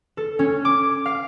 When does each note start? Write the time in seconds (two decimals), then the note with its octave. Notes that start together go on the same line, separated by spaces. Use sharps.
0.17 A4
0.39 C#4
0.65 D6
1.06 F5